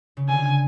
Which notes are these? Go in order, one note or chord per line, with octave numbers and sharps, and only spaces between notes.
C#3
D3 G#5